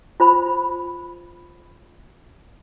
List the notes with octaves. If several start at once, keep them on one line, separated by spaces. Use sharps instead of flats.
F4 C5 B5